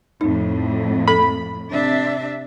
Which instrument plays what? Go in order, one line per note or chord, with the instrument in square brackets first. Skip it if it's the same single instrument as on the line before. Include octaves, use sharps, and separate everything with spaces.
[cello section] F2 A2 [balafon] D#4
[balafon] A4 [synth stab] B5
[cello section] C3 D4 E5